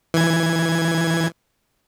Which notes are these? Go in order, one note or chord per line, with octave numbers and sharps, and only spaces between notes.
E3 G#6